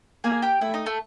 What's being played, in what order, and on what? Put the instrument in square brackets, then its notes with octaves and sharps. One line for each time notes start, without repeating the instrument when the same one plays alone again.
[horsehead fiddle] A#3 [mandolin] G#4 G#5
[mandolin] G4 G5
[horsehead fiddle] A3 [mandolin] E4 E5
[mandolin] D#4 D#5
A3 A4